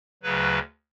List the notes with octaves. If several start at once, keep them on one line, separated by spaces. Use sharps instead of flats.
D2 C#3 F#3 B4